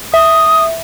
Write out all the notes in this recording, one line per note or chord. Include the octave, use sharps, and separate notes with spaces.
E5 D#6